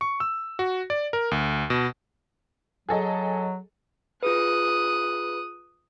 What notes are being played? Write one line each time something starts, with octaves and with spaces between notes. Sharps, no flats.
C#6
E6
F#4
D5
A#4
D2
B2
F#3 G#4 A4 D#5
F4 G#4 B4 D#6 F#6